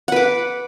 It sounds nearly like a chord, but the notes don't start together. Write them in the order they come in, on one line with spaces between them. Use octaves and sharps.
F#5 B4 D6